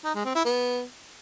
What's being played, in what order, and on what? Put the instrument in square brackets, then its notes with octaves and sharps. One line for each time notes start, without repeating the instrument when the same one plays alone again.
[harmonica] D#4
G#3
C4
E4
B3